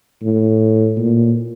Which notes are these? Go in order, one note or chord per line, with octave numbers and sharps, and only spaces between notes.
A2
A#2